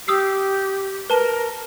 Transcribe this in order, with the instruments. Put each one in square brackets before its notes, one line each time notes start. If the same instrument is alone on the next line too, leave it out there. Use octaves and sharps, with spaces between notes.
[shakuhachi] G4 [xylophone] D#6 E6 C7
[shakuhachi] A#4 [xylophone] B4 A5 G7